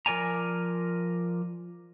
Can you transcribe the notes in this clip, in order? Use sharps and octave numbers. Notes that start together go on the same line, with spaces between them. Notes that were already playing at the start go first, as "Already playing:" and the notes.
F3 A#4 D5 G#5 A#5